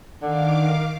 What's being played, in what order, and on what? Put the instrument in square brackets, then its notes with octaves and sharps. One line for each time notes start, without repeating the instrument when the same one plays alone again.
[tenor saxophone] D3 [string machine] D#3 F5 D6